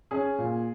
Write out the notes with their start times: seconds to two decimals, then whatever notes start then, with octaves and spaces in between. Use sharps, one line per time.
0.11 C#4 G#4
0.38 A#2